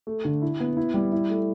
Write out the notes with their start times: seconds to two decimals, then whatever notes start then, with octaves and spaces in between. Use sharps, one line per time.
0.07 A3
0.25 D3
0.42 E4
0.60 B3
0.77 E4
0.94 G3
1.12 E4
1.30 A3